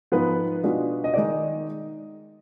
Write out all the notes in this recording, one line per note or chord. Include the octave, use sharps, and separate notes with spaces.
G#2 F3 B3 F4 B4
B2 G#3 B3 D4 F4
D#5
D#3 G#3 D#4 D5